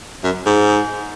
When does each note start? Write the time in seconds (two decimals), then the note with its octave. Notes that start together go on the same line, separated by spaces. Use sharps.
0.24 F#2
0.46 G#2